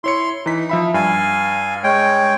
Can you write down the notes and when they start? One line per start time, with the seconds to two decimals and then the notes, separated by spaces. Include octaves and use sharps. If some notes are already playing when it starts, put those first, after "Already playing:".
0.04 E4 C#5 C6 C#7
0.46 E3 D#4 B6
0.69 F3 E5 B5
0.94 G2 F5 G#5
1.84 G#3 C#5 G5